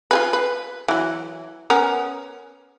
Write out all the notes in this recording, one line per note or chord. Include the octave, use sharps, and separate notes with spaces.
F4 G#4 B4
B4
E3 F#3
B3 C#4 A#4